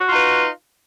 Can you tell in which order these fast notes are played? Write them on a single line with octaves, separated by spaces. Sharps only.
F#4 F4 D#4 B4